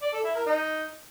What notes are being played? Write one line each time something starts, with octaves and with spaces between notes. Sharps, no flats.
D5
A4
E4
A#4
D#4